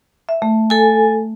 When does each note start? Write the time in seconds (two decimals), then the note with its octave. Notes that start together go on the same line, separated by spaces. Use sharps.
0.29 E5
0.42 A3
0.70 A4 G#5